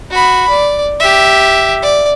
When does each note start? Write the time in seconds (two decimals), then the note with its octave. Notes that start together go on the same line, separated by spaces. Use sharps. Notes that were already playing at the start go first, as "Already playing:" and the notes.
0.11 F#4 B5
0.49 D5
1.00 G4 E5
1.83 D5